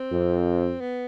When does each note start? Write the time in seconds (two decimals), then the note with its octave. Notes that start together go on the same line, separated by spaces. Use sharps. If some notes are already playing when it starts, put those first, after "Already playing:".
Already playing: C4
0.12 F2
0.80 B3